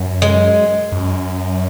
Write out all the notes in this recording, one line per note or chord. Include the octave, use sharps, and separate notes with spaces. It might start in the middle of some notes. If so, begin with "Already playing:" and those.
Already playing: F#2
G#3
F#2